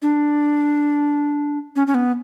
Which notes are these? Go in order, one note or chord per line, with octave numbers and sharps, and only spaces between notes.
D4
C#4
C#4
B3